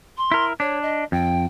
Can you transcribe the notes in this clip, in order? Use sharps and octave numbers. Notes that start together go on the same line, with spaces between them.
C6
E4 A#4
D4 C#5
D#5
F2 G5